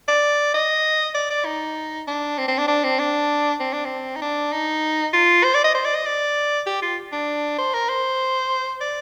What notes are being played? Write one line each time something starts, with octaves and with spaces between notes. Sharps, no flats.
D5
D#5
D5
D5
D#4
D4
C4
C4
D4
D4
C4
D4
C4
D4
C4
D#4
D4
D#4
F4
C5
D5
D#5
C5
D5
D#5
D5
G4
F4
D4
C5
A#4
C5
D5